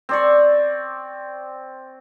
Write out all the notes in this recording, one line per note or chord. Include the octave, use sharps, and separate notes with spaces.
C4 D5 C#6